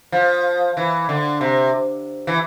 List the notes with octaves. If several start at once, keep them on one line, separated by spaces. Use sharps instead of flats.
F3
E3
D3
C3
E3